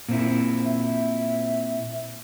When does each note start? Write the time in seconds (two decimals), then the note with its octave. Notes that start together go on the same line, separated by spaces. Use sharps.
0.09 A#2 C4 E4
0.65 E5